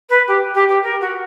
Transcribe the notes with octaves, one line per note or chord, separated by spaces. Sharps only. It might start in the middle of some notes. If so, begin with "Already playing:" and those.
B4
G4
G4
G4
A#4
F#4